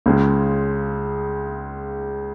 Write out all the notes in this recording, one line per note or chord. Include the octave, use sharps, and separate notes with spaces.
C#2 C#3 G#3